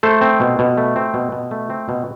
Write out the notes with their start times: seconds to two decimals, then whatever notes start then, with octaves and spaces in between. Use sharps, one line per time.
0.03 A3 A4 C5
0.21 C4
0.40 B2
0.59 B2
0.77 A3
0.96 C4
1.14 B2
1.32 B2
1.51 A3
1.70 C4
1.89 B2